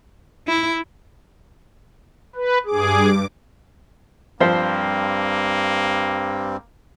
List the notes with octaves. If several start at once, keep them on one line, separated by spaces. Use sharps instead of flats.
E4
B4
G2 G#4 D6
G2 F3 G3 A#3 C4 C5